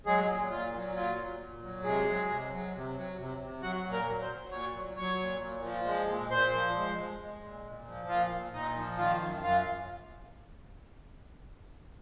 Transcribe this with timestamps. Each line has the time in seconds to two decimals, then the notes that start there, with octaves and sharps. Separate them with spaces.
0.06 F#3 G#3 G#4
0.28 A#2
0.51 A#2 F4
0.74 F#3
0.96 A#2 F4
1.18 A#2
1.40 A#2
1.63 F#3
1.84 C3 G#3 G#4
2.07 F#3
2.30 C3
2.52 F#3
2.74 C3
2.96 F#3
3.18 C3
3.41 C3
3.62 F#3 F#4 F#5
3.86 A#2
3.93 A#4 A#5
4.08 F#3
4.22 C5 C6
4.30 F#3
4.52 A#2 C#5 C#6
4.74 F#3
4.96 F#3 C#5 C#6
5.19 A#2
5.42 A#2
5.64 F3
5.85 G#3
6.08 A#2
6.31 A#2 C5 C6
6.53 F3
6.76 G#3
6.98 G#3
7.20 G#3
7.42 A#2
7.64 A#2
7.87 F3
8.09 A#2 F4 F5
8.31 A#2
8.53 A#2 D#4 D#5
8.76 F3
8.98 D#3 F4 F5
9.21 F#2
9.42 F#2 F4 F5